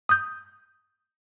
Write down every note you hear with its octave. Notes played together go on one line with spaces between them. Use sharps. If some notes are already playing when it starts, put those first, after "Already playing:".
D#6 G6